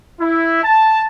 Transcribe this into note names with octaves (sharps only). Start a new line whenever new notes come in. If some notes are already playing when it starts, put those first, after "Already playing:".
E4
A5